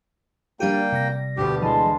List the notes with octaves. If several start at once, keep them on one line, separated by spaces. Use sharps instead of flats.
G3 A#3 D4 G4 G5 D#7
C3 A#6
D2 B2 G4
E3 G#3 A5 C6